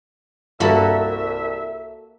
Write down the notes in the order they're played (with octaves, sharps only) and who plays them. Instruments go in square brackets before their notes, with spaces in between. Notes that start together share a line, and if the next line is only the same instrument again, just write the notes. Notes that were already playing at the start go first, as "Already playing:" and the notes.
[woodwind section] C2 E5 [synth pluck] G2 B5 [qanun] A#3 F#4 A4